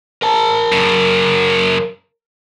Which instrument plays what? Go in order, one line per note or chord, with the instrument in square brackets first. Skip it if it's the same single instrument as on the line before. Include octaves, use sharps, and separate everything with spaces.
[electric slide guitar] A#4 A5 A#5
[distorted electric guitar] F#2 C#3